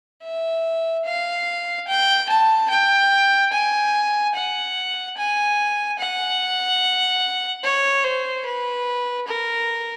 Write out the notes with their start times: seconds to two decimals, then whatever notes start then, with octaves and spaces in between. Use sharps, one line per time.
0.23 E5
1.05 F5
1.88 G5
2.29 A5
2.70 G5
3.52 G#5
4.35 F#5
5.17 G#5
5.99 F#5
7.64 C#5
8.04 C5
8.45 B4
9.28 A#4